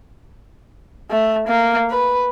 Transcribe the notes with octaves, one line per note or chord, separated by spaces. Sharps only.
A3
A#3
B4